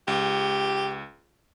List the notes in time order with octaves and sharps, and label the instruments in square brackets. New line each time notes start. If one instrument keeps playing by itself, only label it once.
[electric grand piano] C#2 [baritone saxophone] G4